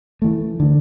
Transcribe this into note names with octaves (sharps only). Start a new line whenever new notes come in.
E3 A3
D3